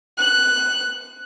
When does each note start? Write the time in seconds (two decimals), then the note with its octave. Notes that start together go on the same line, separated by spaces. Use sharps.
0.17 F#6